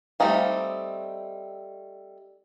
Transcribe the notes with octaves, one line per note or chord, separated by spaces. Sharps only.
G3 A3 C4 D#4 F5